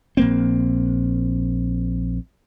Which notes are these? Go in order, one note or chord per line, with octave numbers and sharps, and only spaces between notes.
A#1 A#3 C4